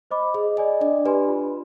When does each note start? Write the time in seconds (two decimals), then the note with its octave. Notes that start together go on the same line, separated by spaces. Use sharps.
0.11 C5 D#5 B5 D6
0.34 G#4 D#5
0.57 D5 D#5 G#5
0.81 D4 D5
1.05 G4 B4 D5 G#5 C6
1.28 F4